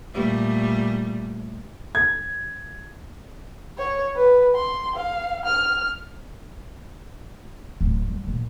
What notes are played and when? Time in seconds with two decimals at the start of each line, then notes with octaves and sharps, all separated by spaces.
0.14 A#2 G3 A3
1.95 G#6
3.78 C#5
4.16 B4
4.55 C6
4.96 F5
5.45 F6
7.81 D1
8.07 G3
8.27 A#1